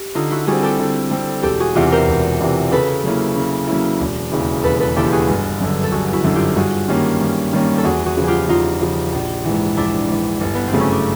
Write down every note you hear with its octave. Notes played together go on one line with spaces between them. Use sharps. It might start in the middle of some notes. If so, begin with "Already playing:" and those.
Already playing: G4
D3 D#4 F4
E4 F#4
G3 C4 F#4 G#4
G4 A4
D3
G3 C4
E1 G4 A4
F#4 G#4
E2 C3 E3 F4 G4
A#4 C5
E1
E2 C3 E3
C#3 A4 B4
F#3 A#3 C#4 E4
C#3
F#3 A#3 C#4 E4
E1
D#2 C#3 E3
E1 A4 B4
A4 B4
D#2 C#3 E3 G4 A4
F#4 G#4
G1
F#2 D3
A4
G1 F#4 G#4
E4 F#4
F#2 D3
F4 G4
G2 F#4 G#4
D#3 G3 A#3 C#4
G2
D#3 G3 A#3 C#4
A4
E2 F#4 G#4
F#4 G#4
C#3 F3
F4 G4 G#4
E2 D#4 F4
C#3 F3
A#1
G#2 E3
A#1 D4 E4
G#2 E3
G1
B3
C4
F#2 C#3 F#3 A3
C#4
D4